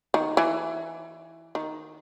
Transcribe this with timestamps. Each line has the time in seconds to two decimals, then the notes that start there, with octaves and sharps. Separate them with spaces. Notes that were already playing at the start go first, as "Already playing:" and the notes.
0.14 D#3
0.37 E3
1.55 D#3